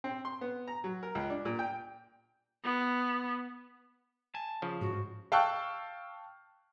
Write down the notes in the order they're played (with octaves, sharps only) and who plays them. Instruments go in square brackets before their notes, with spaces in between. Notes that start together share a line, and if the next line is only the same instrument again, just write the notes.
[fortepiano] C4
C6
B3
A#5
F#3
A#4
C#2
D4
A#2
G5
[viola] B3
[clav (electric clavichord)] G#5 [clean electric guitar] A5
[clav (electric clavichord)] C#3 F3
[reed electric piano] G#2 [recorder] F#4
[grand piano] F5 G5 A5 C#6 E6 F#6